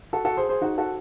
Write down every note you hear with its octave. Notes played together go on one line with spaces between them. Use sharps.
F#4 A4
F#4 A4
G#4 C5
G#4 C5
D#4 F#4
F#4 A4